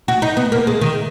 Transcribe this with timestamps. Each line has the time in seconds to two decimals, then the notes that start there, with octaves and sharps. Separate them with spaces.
0.08 F#4
0.22 D#4
0.37 B3
0.52 A#3
0.67 G#3
0.81 D#3